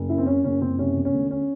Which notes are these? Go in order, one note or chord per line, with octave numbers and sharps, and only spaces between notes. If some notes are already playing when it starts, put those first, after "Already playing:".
Already playing: F#1
F#2 E4
C4
F#2 C#4
F#1 C#4
F#1 C4
C3 C#4
E1
C#4
D2
C#4